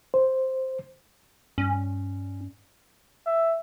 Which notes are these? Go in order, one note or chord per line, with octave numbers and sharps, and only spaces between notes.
C5
G2 C#4
E5